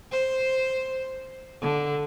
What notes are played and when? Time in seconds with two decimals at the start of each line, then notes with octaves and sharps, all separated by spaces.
0.12 C5
1.61 D3